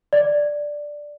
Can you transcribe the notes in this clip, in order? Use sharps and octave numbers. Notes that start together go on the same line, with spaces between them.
D5